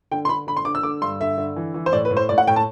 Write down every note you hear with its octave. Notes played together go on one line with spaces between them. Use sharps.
D3 G5
C6
D3 B5
D3 B5
C6
D3 D6
E6
D3 D6
G2 C6
D3 E5
D3
E3
E3
C5
A2 D5
B4
A2
C5
A2 D5
F#5
A2 G5
A5